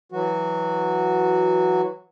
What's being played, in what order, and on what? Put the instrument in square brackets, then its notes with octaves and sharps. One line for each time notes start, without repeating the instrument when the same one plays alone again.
[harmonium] E3 F#3 F#4